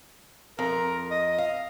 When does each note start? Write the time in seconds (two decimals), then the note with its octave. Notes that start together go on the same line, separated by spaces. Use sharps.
0.59 F2 A#4
1.11 D#5
1.38 F5